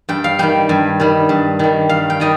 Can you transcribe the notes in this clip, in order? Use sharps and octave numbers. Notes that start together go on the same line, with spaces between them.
G2 G5
F5
D#3 G3 G5
G2
D#3 G3
G2
D#3 G3
G2 F5
G5
D#3 G3 D#5